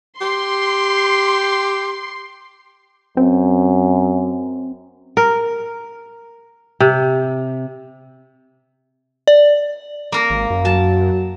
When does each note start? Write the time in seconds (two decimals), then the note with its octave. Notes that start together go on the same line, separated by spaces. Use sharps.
0.21 G4 C6
3.17 F#2 C4
5.17 A#4
6.80 C3
9.27 D5
10.12 A#3 A#4
10.30 G#1
10.50 F#2
10.65 F#3 A5